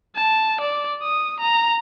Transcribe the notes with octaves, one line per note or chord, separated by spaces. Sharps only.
A5
D5
D#6
A#5